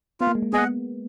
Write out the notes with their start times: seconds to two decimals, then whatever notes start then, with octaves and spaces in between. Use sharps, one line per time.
0.20 B3 F4
0.27 A#3
0.35 G#3
0.43 A#3
0.53 B3 G#4 D#5 F#5